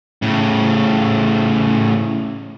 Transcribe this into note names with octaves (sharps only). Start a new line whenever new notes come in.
A2 C#3